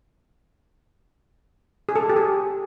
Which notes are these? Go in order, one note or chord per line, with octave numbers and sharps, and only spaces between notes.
G#4
A4
G#4
G4
G#4